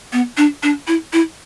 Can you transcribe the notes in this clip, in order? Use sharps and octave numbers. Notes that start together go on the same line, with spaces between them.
B3
D4
D4
E4
E4